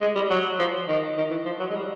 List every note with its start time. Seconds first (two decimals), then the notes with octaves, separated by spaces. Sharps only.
0.01 G#3
0.15 G3
0.30 F#3
0.59 F3
0.88 D#3
1.17 D#3
1.31 E3
1.45 F3
1.59 F#3
1.70 G#3
1.75 G3